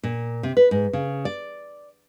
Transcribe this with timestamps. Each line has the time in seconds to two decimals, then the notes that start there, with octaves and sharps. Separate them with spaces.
0.03 A#2
0.43 C3
0.57 B4
0.71 G#2
0.93 C#3
1.25 D5